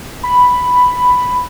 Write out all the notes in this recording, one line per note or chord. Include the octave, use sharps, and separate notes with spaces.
B5